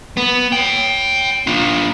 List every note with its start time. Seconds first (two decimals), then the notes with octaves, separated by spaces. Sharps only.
0.17 B3
0.52 C#5 G5
1.47 D4 F4